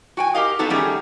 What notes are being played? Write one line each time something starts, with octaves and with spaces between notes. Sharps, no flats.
F#4 G5 G#5
G4 A#4 D#5 F5
B3 C4 D#4 F#4 A4 B4
D#3 G3 A3 C#4 D#4 G#4